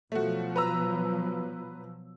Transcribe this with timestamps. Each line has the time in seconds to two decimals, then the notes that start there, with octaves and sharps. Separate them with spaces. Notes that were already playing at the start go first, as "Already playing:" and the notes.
0.12 B2 F3 F#3 A3 F#4
0.56 B4 A#5 E6